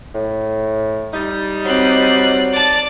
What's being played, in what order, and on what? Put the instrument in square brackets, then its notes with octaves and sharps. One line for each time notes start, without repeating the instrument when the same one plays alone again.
[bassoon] A2
[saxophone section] G3 D#4
[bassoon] F#3 [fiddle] C4 F#6
[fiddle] D5 A5